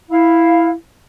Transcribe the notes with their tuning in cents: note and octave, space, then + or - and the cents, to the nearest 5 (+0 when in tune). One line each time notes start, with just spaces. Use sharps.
E4 +0 F5 +0